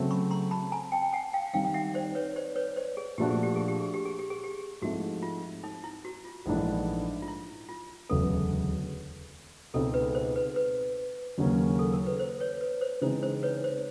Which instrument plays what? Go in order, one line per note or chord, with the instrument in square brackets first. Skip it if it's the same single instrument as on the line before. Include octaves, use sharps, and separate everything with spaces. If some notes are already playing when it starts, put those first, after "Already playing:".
Already playing: [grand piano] C#3 F#3 A3 C4
[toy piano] B5 C#6
A#5 C6
A5 B5
G#5 A#5
G5 A5
G5
F#5 G#5
F5 G5
[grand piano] D#3 G3 C4 D#4 [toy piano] F5 G5
[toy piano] G5
E5 F#5
C5 D5
B4 C#5
C5 D5
B4 C#5
C5 D5
G#4
[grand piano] A#2 F3 A3 D4 F#4 [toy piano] G4
[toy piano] G#4
G4
G#4
G4
G#4
G4
G#4
G4
G#4
G4
[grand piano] G#2 F3 A3 C4 E4 [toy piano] F#4
[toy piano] F4
D#4
E4
F#4
F4
[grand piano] A#1 G#2 E3 A3 D4
[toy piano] F4
E4
F4
[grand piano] E1 D2 C#3 F#3 B3 [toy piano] A4
[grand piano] C#2 B2 G#3 C4 D#4 [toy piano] A4
[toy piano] B4
C5
B4
B4
[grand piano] D#2 C#3 F#3 A#3 C#4
[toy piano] A4
A#4
B4
C5
B4 C#5
B4
C5
[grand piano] C#3 E3 G#3 C4 D#4 [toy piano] C5
[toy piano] C5
B4 C#5
C5